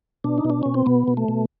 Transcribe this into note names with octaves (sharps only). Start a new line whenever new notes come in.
B2 D4
D#4
B2
D4
B2 C#4
C4
B2 B3
B2
A3
B2